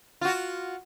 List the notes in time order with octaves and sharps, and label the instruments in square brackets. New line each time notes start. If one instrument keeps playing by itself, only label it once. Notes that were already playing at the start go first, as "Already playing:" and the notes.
[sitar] F4 F#4